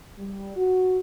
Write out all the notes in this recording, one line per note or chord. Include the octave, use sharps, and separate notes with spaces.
G3
F#4